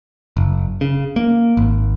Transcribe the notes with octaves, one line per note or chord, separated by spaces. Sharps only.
F#1
C#3
A#3
G#1